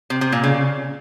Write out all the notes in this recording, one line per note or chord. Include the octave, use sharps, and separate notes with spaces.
C3
C3
A#2
C#3